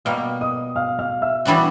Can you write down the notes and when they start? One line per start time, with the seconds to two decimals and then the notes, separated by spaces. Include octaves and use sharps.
0.05 B2 G3 A#3 F5 F6
0.41 D#5 D#6
0.76 F5 F6
0.99 F5 F6
1.22 E5 E6
1.45 E3 G3 B3 D4 F#4